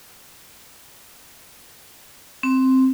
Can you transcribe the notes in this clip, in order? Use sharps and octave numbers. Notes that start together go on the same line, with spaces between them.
C4